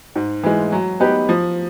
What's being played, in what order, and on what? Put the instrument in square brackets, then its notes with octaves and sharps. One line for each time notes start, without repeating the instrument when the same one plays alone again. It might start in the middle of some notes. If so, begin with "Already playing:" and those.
[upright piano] G#2
E3 G#3
F#3
B3 D#4 G4 B4
F3